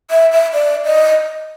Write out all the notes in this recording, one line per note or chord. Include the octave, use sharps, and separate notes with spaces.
E5
E5
D5
D#5